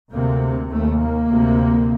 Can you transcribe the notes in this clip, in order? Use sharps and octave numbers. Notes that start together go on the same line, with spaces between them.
D2 C3 A#3
D#2 A3
A#3
D2 C3